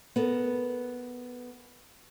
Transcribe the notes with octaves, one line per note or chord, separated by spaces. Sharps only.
B3 A4 A#4